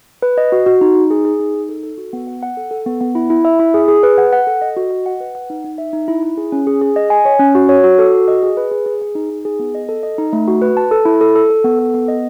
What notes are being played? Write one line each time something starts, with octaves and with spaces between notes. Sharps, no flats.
B4
D#5
F#4
F#4
D#4
D#4
G#4
G#4
D#4
D#4
A4
A4
F#4
B3
F#5
F#5
A4
A4
B3
B3
E4
E4
E5
E4
G#4
G#4
B4
F#5
F#5
A4
D#5
F#4
D#5
F#5
B4
F#5
D#4
D#4
E5
D#4
E4
E4
G#4
C#4
G#4
G#4
D#5
G#5
C#5
C#4
F#4
C#5
F#4
A4
F#4
D#5
G#4
B4
G#4
G#4
G#4
D#4
D#4
G#4
B3
D#5
A4
D#5
D#4
A3
F#4
B4
A5
A4
E4
A4
A4
A4
B3
A4
B3
D#5